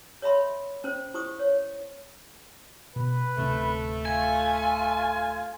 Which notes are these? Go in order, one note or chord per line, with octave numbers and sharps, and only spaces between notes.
C#5 D#5 E5 B5 C6
C#4 C5
E4 C5 C#6 D#6
C#5
B2 B4
D1 C3 A3 C#4
F4 G#5